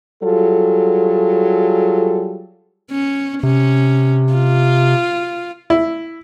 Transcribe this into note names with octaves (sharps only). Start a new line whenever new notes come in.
F#3 G3 F4 G#4 A4
C#4
C3 C#4
F4
E4